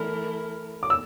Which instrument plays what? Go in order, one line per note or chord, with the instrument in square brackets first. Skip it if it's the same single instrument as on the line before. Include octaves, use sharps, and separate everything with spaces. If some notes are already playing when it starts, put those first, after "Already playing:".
Already playing: [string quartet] E3 A3 E4 A#4 [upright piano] F6
[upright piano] D6
E6